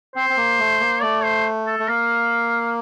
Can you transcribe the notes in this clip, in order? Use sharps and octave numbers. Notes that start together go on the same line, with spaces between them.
C4 C5
C4
A#3
A3
A#3
A3 D5
C5
A4
A3
A#3 F5